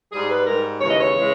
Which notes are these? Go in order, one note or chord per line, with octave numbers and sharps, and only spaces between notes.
G#2 G3 G#4
B4
G#2 G3 A#4
D#2 C#3 E3 G#3 C#5
D#5
C#5
C#3 E3 G#3